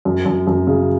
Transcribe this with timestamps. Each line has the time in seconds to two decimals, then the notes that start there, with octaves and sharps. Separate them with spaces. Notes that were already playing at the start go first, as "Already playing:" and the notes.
0.05 F#2
0.25 F#2
0.47 F#2
0.67 C#3